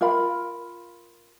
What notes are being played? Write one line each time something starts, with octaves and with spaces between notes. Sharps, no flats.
F4 A#4 F5 B5